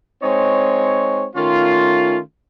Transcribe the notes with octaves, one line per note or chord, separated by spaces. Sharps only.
G#3 C4 D#4 C#5
D#3 A3 C#4 F4